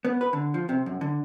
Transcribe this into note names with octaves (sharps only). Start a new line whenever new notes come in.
B3
B4
D3
F3
C3
F#2
D3